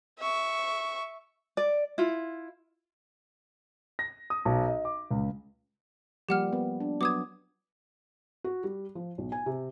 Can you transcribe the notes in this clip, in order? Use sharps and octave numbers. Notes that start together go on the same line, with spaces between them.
E5 C#6
D5
E4 F4
A#6
D#6
B1
D#5
D6
C#2
F3 G3 A#3 G4 F#5 F6
B3
D4
F#3 B3 D6 D#6 G#6
F#4
G3
F3
B1
G#5
C3